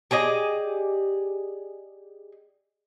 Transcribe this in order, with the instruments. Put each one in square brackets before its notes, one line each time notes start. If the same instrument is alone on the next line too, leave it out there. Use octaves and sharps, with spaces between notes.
[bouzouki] G4 G#4 D5 D#5